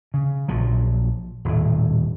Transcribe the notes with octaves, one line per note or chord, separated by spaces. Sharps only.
C#3
A#1 F3 F#3
D#1 A2